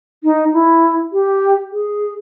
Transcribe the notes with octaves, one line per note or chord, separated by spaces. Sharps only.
D#4
E4
G4
G#4